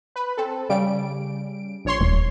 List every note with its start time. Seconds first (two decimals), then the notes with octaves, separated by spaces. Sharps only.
0.16 B4
0.37 C4 A4
0.69 C#3 G3 D7
1.85 A#1 C#5 C6
2.01 D#1